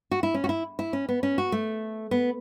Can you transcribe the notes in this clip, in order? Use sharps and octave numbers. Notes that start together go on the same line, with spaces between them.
F#4
E4
C#4
F#4
E4
E4
C#4
B3
C#4
F#4
A3
B3